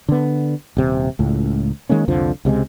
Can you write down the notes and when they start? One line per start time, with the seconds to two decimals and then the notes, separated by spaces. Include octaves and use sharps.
0.09 D3 B3
0.77 D#1 C3
1.19 C#2 A2
1.89 D#3 G#3 A#3 C#4
2.08 C2 F2 D3 F3
2.45 C#2 C3 G3 G#3